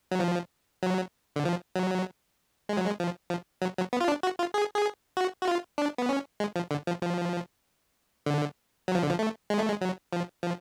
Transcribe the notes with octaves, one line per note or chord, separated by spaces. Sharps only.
F#3
F3
F#3
D3
F3
F#3
G#3
F#3
G#3
F3
F3
F#3
F#3
B3
F4
D4
F#4
F4
G#4
G#4
F#4
F#4
F4
D4
B3
C#4
G#3
F3
D3
F3
F3
D3
F#3
F3
D3
F3
A3
G#3
A3
G#3
F#3
F3
F3